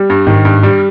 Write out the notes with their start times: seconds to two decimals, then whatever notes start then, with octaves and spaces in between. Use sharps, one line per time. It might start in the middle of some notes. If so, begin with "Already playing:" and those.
Already playing: G3
0.10 G2
0.27 G#2 D#3
0.45 G2
0.63 G3